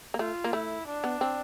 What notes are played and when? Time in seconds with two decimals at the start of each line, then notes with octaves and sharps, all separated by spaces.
0.14 A#3
0.19 A3 F4
0.44 A#3
0.53 A3 E4
0.87 D4
1.04 B3
1.21 C4